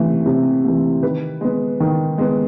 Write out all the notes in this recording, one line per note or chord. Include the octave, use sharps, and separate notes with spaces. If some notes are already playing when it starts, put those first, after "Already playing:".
Already playing: C3 E3 A3
C3
E3 A3
D#3 B4
G#3 B3
D#3
G#3 B3